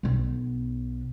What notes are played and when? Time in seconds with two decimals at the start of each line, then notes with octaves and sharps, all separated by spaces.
0.03 B1 B3